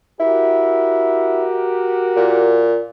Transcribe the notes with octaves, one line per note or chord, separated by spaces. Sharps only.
E4 F#4 G4 A#4
A#2